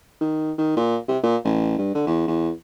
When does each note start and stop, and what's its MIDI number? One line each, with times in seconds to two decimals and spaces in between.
0.21 0.52 51
0.58 0.72 51
0.77 0.97 46
1.08 1.18 48
1.23 1.36 46
1.45 1.74 33
1.78 1.90 43
1.95 2.03 50
2.07 2.26 40
2.28 2.51 40